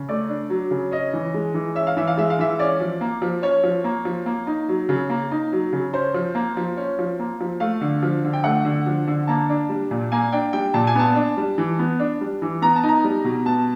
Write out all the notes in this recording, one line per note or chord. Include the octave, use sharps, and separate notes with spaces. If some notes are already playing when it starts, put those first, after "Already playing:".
Already playing: C#3
A3 D5
D4
F#3
C#3
C#4 D#5
E3
G#3
E3
C#4 E5
F5
E3 E5
F5
G#3 E5
F5
E3 E5
C#4 D5
F3
A#3
F3
C#4 C#5
F3
A#3
F3
A#3
D#4
F#3
C#3
A#3
D#4
F#3
C#3
C#4 C5
F3
A#3
F3
C#4
F3
A#3
F3
A3 F5
D3
F3
D3
G5
A3 F#5
D3
F3
D3
A#3 A5
D4
G3
A#2
A#3 G#5
D4 G5
G3 G5
A#2 A5
G#5
B3 A5
D4
G3
E3
B3
D4
G3
E3
B3 A#5
A5
D#4
A#5
G3
B2
B3 A5